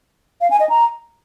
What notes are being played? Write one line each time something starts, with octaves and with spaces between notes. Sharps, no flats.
F5
G#5
D#5
A#5